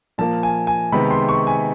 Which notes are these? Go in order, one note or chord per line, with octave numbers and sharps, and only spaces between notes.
A#2 F3 A#3 A5
G#5
G#5
C3 D#3 G#3 B3 B5
C6
C#6
G#5